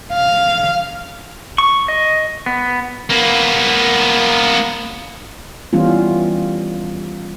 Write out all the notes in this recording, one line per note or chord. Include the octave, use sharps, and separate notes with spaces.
F5
C#6
D#5
B3
A#3 B3
E3 G3 B3 C#4 F4